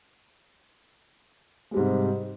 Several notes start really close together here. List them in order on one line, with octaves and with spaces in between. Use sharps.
G#3 G3 G#2 C3